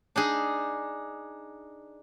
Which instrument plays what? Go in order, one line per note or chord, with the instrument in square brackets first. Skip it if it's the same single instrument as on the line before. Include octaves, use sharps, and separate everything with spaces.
[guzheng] D4 D#4 G#4